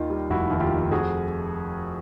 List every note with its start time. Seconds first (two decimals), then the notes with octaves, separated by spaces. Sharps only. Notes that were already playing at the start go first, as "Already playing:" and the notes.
Already playing: D#2 D#3 D#4 F4
0.10 G3
0.30 F1 E4 F#4
0.50 D#2
0.60 F4 G4
0.71 D#3
0.91 F2 F#4 G#4